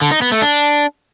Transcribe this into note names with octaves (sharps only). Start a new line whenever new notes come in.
D3
D#4
B3
A3
D4